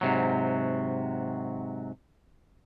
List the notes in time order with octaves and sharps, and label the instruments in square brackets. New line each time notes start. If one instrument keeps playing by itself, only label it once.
[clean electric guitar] G#2 C3 F#3